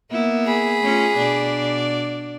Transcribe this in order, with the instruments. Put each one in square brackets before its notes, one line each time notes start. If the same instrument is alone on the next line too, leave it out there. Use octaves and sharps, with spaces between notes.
[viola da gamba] A#3 B3 E4
[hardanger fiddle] G#4 B5
[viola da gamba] A3 C#4 F4
B2 D4 D5